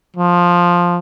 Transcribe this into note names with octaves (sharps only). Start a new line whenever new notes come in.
F3